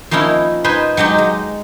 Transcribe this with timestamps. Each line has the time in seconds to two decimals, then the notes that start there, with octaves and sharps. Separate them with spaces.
0.11 F3 A#3 C#4 D#4 E4
0.64 D#4 B4 C5 G#5
0.97 F#3 G#3 D#4 G4
1.18 G#3